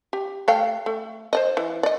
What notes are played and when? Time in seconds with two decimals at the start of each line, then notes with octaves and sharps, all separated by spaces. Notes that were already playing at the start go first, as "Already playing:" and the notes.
0.13 G4
0.48 A3 F5 G5
0.86 A3
1.33 C5 D5 D#5
1.57 E3
1.83 D5 D#5